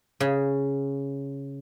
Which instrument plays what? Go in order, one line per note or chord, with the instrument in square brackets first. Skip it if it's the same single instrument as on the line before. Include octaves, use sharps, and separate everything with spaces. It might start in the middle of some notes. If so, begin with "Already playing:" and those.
[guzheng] C#3